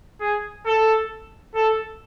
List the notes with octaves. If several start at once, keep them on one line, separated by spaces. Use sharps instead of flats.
G#4
A4
A4